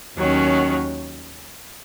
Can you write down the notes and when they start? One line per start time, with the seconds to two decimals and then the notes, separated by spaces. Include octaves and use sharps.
0.18 D#2 D#3 F#3 C#4